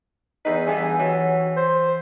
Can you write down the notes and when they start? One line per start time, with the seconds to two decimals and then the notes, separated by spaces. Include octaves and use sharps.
0.45 E2 D#4 B4
0.67 G2 E3 B3 G#4
1.00 E3 F#3
1.57 C5